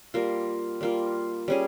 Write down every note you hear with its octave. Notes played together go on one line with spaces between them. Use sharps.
G3 A#3 F4
G3 A#3 F4
G3 C#4 G#4